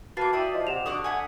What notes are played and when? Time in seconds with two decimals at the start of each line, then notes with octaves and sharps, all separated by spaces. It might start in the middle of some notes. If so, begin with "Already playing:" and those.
0.17 A#3 F#4 B4 A5 D6 A6 C7
0.33 E4 D5 E5 G5 D#6
0.54 F3 D#5
0.67 C3 F#5 E7 F7
0.86 D3 F#4 F#5 D6 D#6
1.04 E5 F#5 G#5